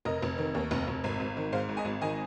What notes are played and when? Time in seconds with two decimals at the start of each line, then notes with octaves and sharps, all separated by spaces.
0.05 F1 A#4 D#5
0.22 F1
0.38 D#3
0.55 D#2
0.71 F1
0.88 F1
1.04 G#1
1.20 G#1
1.37 D#3
1.52 G#2 C5 F5
1.69 G#1
1.77 D#5 G#5
1.85 G#1
2.01 D#3 D#5 G#5